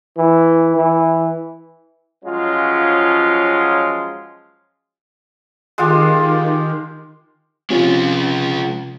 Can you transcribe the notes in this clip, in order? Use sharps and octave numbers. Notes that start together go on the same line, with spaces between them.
E3
E3
F3 F#3 G#3 C#4 F4
D#3 G#3 F4 G4
C3 F3 G#3 C#4 F4